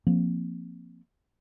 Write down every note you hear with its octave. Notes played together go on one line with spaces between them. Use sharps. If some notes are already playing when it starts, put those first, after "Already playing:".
F3 A#3 C4